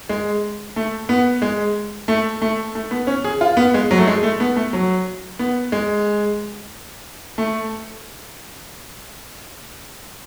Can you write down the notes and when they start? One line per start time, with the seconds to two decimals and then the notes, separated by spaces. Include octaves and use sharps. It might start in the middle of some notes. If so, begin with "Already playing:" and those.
0.09 G#3
0.76 A3
1.09 B3
1.42 G#3
2.08 A3
2.42 A3
2.75 A3
2.91 B3
3.07 C#4
3.24 G#4
3.41 F4
3.57 B3
3.74 G#3
3.91 F#3
3.98 A3
4.07 G#3
4.23 A3
4.40 B3
4.56 A3
4.73 F#3
5.39 B3
5.72 G#3
7.38 A3